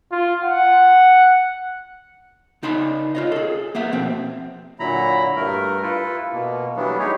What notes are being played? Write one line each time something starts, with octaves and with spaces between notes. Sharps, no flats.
F4
F#5
C#3 D#4 A5 B5 C6
F4 C#5 D#5
G#4 A4
A#3 B3 E5
B2 F3 C4
A#2 D3 F#3 E4 A#5 B5
G2 A3 A#4
E4 F4 A4 B4
B2 A#3
E3 F#3 G3 A3 B3 D4
D#4 G4 G#4 C#5